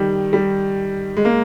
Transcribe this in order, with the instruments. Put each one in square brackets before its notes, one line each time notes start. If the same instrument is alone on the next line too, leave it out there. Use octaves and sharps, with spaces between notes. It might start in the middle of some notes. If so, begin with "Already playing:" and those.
Already playing: [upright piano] D#3 G3
G3
G#3
A#3